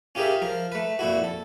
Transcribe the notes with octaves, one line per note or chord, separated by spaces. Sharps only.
C#4 F4 G4 G#4 A#4 E5
F3 A#4
A3 B4
F2 A#2 E4 F#4
A4